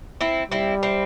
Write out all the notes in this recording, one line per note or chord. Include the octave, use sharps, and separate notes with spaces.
C4 E4
G3 C4 E4
C4 E4